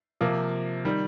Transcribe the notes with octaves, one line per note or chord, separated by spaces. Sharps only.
C3 F3 A#3
D#3 G3